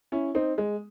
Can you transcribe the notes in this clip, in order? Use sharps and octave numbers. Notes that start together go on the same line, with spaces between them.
C#4 E4
C4 D#4
G#3